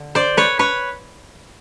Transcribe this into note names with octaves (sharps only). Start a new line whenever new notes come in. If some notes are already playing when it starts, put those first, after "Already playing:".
Already playing: D3
C5 D5
B4 C#5
B4 C#5